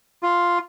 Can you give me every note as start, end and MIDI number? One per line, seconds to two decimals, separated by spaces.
0.23 0.58 65